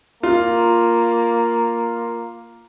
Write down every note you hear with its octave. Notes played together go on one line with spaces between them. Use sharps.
A#3 F4